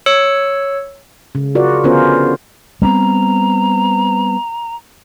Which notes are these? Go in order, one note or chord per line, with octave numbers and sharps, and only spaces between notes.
C#5 E6 C#7
C#3
F4 F#4 A#4 D5
D3 B3 C#4 F4 A#4 C5
G3 B3 C4 A#5